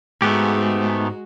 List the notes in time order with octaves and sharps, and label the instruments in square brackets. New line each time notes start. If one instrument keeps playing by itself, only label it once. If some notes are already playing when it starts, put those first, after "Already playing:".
[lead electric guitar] G#2 [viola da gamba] G#3 F#4 [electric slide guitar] A3 B3 G4